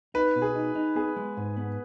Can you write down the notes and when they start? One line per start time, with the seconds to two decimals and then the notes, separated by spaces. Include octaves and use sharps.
0.14 D#4 B4
0.36 B2
0.42 G#4
0.55 D#4
0.75 D#4
0.95 B3 G#4
1.16 G#3
1.37 G#2
1.56 B3